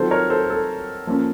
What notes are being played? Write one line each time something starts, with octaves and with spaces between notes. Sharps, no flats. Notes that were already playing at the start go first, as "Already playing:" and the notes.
Already playing: D#3 F#3 C4 F4 A4 C5
A#4 C#5
A4 C5
A4
F3 A#3 C#4